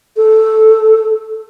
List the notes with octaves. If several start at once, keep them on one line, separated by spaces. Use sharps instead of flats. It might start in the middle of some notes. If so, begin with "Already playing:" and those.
A4